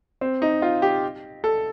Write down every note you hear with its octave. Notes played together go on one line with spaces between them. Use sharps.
C4
D#4
F4
G4
A4